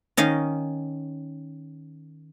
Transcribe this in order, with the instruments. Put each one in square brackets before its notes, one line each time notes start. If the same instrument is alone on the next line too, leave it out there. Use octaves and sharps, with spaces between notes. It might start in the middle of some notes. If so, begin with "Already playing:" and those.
[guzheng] D#3 C#4 D#5 F5